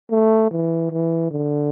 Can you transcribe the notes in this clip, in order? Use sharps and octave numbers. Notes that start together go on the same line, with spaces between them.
A3
E3
E3
D3